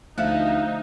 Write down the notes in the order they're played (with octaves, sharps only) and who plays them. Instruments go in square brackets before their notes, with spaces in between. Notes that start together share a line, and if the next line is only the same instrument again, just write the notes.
[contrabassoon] D2 [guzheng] F3 [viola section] D#4 [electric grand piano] E5 F5 F#6